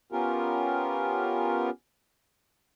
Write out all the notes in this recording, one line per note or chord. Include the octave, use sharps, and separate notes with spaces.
B3 C#4 F4 G4 A#4